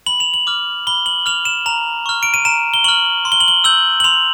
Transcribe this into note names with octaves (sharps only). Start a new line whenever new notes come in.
B5 F#7
F7
F#7
D6 F6
B5 G7
F#7
D6 F6 F7
E7
A#5 F7
C#6 F6
D7
D#7
A#5 E7
G7
C#6 F6 F#7
C6
G7
F#7
G7
E6 G6 F#7
F#7
C6 F7